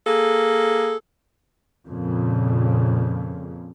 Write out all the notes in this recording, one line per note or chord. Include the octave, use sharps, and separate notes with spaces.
A#3 G#4 A4
F2 A#2 C#3